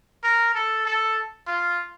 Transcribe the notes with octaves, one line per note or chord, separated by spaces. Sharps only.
A#4
A4
A4
F4